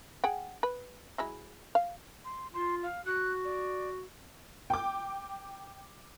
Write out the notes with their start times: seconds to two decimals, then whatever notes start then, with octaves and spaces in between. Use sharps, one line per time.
0.24 G#4 F#5 G5
0.63 B4
1.18 F#3 G#3 E4
1.75 F5
2.25 C6
2.54 F4 C6
2.83 F5
3.05 F#4 F#6
3.45 D5
4.70 G5 D6